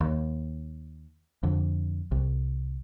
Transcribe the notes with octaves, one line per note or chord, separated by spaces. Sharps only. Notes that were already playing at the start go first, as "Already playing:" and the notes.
D#2
F2 D3
C2